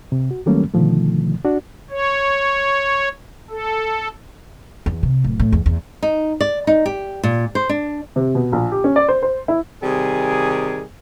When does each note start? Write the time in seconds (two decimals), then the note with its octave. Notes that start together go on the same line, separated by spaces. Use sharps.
0.12 C3
0.31 F#4
0.46 D#3 F#3 G3 A3 A#3 C#4
0.74 B2 D3 D#3 F3 A3
1.45 D4 F#4
1.91 C#5
3.50 A4
4.86 E2
5.03 C3
5.24 D1
5.40 A2
5.52 E2
5.66 E2
6.03 D#4
6.41 D5
6.67 D#4
6.86 G4
7.23 A#2
7.55 C5
7.69 D4
8.16 C3
8.35 B2
8.52 A#1
8.72 G4
8.84 C#4
8.96 D5
9.08 C5
9.23 C5
9.48 E4
9.82 C3 D#3 G3 G#4